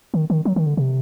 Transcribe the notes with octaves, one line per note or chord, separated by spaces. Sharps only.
D#3
D#3
F#3
D#3
D3
C3